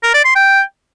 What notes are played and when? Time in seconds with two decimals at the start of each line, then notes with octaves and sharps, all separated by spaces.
0.03 A#4
0.14 D5
0.25 C6
0.35 G5